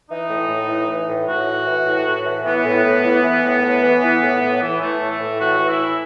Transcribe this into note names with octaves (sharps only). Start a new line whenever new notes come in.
E3 D#4
A2
A2
E3
E3
A2
A2 F#4
E3
E3
A2
A2
E3
E3 B3
A2
A2
E3
E3
A2
A2
E3
E3
A2
A2
E3
E3 A3
A2
A3
A2
E3 F#4
E3
E4
A2